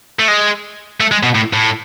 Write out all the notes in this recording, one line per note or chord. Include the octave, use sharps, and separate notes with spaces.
A3
G#3
A3
G#3
B2
A2
A2